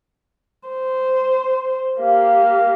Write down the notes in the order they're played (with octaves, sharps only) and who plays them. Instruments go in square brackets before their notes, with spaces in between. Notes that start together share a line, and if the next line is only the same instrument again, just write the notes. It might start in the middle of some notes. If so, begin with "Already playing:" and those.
[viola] C5
[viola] A#3 G4 [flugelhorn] F5